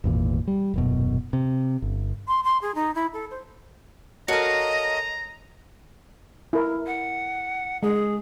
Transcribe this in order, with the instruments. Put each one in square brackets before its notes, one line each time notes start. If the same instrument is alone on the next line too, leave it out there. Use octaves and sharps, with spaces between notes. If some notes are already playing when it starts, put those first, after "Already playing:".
[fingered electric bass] G#1 E2 A#2
G3
D#1 F#2 B2
C3
G1
[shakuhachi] C6
C6
G#4
D#4
E4
A4
C5
[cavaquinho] F#4 F5 [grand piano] A4 A#4 C#5 [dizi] D#5 [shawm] A#5
[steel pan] E4 A#4
[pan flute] F#5
[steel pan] G#3 [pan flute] G#4